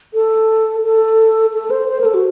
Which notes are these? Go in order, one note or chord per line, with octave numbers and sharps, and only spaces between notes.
A4
A4
A4
C5
C5
A#4
A4
F#4